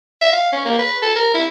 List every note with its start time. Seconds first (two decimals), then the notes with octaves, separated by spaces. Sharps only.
0.22 E5
0.33 F5
0.52 C#4
0.65 A#3
0.79 B4
1.02 A4
1.16 A#4
1.34 E4